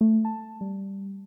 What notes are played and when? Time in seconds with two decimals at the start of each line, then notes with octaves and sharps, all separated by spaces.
0.01 A3
0.25 A5
0.61 G3